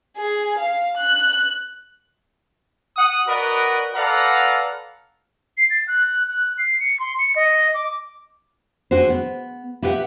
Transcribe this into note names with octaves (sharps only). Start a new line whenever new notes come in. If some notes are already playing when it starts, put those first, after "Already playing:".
G#4
F5
F#6
F#5 D#6
F#4 A#4 B4 D5 D#5 F#5
A4 B4 D5 F5 F#5 A#5
C7
A6
F#6
F#6
C7
C#7
C6
C#7
D#5
D6
D3 F#4 G#4 C5
B3
E4 G4 B4 D#5 E5 F#5